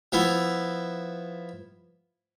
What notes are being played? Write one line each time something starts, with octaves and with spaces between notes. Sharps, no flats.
F3 B3 E4